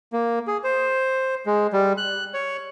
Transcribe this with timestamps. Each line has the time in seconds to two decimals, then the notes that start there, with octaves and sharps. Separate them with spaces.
0.13 A#3
0.47 G#4
0.64 C5
1.46 G#3
1.73 G3
1.98 F#6
2.34 C#5